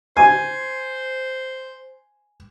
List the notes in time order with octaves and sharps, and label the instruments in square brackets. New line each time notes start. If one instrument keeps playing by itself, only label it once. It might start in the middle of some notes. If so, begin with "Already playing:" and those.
[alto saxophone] C5 [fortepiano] G#5